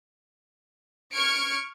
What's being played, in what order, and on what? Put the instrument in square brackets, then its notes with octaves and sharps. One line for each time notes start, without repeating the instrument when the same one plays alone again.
[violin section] C#6 F6 G#6 C#7 D7